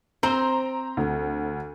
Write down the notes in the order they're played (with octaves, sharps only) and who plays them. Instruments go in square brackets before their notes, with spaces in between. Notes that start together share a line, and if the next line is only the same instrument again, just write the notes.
[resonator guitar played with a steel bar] C4 C5 [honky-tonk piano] A#5
[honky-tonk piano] D2